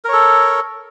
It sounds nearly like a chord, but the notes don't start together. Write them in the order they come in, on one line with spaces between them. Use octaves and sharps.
A#4 C#5 A4